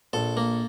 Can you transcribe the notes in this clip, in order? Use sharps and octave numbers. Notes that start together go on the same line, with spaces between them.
A#1 A4
A#3